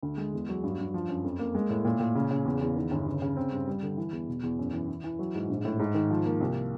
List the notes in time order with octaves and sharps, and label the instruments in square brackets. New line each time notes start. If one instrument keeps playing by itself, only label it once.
[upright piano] D2
G#3
E2
F#3
G2
G2
F3
F#2
F2
A#3
G#3
A2
A#2
A#2
C#3
C#3
E2
E2
D#3
G1
C#3
C#3
C4
G2
G3
D3
E3
E2
B2
E2
F#2
E3
E3
E3
F#3
G#2
A#1
A2
G#2
D#3
F3
A#3
C2